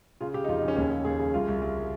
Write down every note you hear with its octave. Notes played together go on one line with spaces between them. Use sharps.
C#3 F4
C#3 G4
D#4
F2 F4
D#4
C#3 C#4
D#2 C#4
C#3
D#2 G#4
C#3
C2 F4
C2
C2